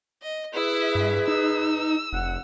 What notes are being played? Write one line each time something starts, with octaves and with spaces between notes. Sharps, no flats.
D#5
E4 G#4 B4 E5
G2
D#4 E6
F1 F#5